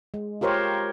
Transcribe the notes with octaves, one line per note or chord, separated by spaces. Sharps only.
G#3
F4 G4 A#4 C5 C#5